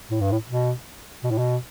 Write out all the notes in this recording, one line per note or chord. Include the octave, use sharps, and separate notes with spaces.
A2
G2
A2
B2
B2
A2
B2